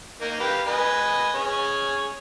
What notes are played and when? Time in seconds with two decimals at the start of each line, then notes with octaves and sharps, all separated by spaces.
0.21 A#3 D#4 A#4
0.40 G4 B4 F5
0.67 B4 D#5 G#5
1.35 C#4 G#4 C#5